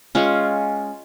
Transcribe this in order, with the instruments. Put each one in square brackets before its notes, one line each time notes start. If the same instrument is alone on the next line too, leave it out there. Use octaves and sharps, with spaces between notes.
[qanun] G#3 C#4 F4